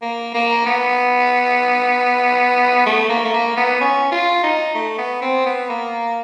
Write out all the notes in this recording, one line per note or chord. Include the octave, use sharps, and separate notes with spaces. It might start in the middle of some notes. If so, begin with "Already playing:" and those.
A#3
A#3
B3
A3
A#3
A3
A#3
B3
C#4
F4
D#4
A3
B3
C4
B3
A#3